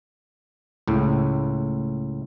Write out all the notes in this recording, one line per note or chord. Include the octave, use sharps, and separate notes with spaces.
C#2 A2